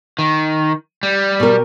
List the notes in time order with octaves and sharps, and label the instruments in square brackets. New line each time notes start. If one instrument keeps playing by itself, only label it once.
[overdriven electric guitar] D#3
G3
[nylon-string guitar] B2 A#4